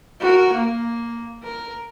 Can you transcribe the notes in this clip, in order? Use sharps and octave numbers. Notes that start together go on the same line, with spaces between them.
F#4 A#4
A#3
A#4